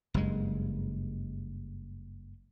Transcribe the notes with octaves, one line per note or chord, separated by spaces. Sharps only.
F#1 G2 G#3